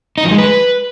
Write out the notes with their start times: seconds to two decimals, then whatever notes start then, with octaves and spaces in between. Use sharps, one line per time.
0.18 D#4
0.24 F3
0.31 G#3
0.38 B4